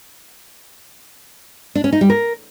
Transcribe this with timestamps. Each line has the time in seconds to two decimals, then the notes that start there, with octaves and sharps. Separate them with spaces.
1.75 D4
1.84 C#4
1.93 D#4
2.01 G3
2.10 A#4